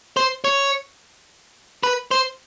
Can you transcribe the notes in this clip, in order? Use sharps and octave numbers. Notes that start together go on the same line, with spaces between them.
C5
C#5
B4
C5